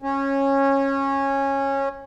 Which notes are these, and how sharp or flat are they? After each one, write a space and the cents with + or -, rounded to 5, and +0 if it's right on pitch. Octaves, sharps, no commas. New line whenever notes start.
C#4 -15